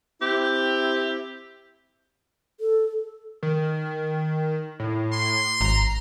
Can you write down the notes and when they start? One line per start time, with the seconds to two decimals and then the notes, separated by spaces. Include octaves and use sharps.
0.21 C4 E4 G4
2.60 A4
3.43 D#3
4.80 A2
5.13 C6
5.61 G#1 A#5